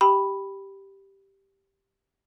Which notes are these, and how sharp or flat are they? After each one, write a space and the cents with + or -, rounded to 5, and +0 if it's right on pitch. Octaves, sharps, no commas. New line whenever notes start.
G4 -5 G5 +0 B5 +0